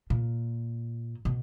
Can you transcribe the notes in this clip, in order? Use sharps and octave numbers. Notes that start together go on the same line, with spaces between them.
A#2
B2